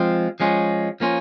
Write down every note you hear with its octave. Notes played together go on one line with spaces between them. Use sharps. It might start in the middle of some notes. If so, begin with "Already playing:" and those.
Already playing: F3 G#3 C4 F4
F3 G#3 C#4 F4
F3 A#3 C#4 F4